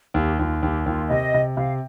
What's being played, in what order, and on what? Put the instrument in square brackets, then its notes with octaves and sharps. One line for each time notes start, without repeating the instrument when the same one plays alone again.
[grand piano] D#2 [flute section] G4
[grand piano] D#2 [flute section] F4
[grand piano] D#2 [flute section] G4
[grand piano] D#2 [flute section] F4
[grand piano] C3 [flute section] D#5
[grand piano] C3
[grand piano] C3 [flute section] F5